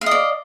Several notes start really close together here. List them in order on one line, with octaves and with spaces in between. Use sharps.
F5 D#5 D5